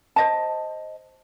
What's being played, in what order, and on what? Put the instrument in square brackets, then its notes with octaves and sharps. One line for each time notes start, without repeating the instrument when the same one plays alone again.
[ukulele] C5 D#5 A5